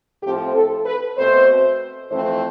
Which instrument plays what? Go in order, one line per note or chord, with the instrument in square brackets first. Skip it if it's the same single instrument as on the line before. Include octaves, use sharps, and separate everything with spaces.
[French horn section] A2 F3 C4 G4
A4
B4
B2 A3 C4 C5
F2 E3 A3 C4 C5